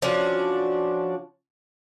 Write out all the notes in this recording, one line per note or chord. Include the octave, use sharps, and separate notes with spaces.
F3 C#4 D4 F#4